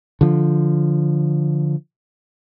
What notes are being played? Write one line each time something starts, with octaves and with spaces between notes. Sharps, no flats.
D3 F3